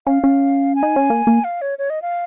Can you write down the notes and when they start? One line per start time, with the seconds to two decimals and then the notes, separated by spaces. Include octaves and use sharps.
0.06 C#4 F5
0.24 C#4
0.75 G#5
0.83 D#4
0.96 C#4
1.10 A#3
1.27 A#3
1.44 F5
1.62 C#5
1.78 C#5
1.90 D#5
2.02 F5